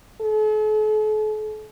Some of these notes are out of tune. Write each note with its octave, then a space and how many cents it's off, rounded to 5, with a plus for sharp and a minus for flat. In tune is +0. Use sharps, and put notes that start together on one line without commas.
A4 -45